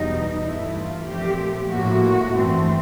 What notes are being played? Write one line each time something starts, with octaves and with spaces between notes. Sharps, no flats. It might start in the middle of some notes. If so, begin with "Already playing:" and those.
Already playing: E2 B2 G3 D#4
G2 E3 A3 E4
F4
A#2 F3 A3 C4 G4
A2 F3 A#3 F#4
G2 E3 A3 C4